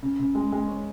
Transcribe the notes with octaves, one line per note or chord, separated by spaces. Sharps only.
C#3
C#3
G#3
G#3
C#4